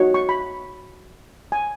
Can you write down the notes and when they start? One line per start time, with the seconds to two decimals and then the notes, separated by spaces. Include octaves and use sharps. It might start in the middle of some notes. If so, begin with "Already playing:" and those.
Already playing: D#4 F#4 C#5
0.14 C#6
0.29 B5
1.52 G#5